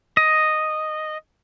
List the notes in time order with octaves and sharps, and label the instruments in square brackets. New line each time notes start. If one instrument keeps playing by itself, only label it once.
[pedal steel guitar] D#5